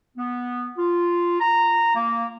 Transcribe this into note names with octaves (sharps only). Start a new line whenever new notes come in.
B3
F4
A#5
A#3